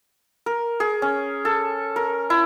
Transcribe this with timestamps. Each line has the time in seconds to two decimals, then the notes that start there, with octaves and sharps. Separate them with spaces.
0.46 A#4
0.80 G#4
1.02 C#4
1.45 A4
1.96 A#4
2.30 E4